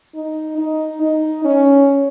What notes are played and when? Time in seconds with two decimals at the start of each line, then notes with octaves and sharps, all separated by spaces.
0.15 D#4
0.58 D#4
1.02 D#4
1.45 C#4